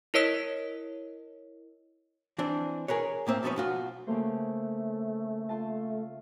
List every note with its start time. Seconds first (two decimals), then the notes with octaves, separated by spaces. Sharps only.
0.14 E4 A#4 C#5 D#5 E6 B6
2.38 E3 C4 D4
2.88 G#4 A#4 B4 C#5
3.27 A2 A#3 C4 E5
3.43 B1 G#2 F3 B3 C#4 B4
3.56 B1 F4 F#4
4.07 C#3 A3 A#3 C5
5.49 F4 A5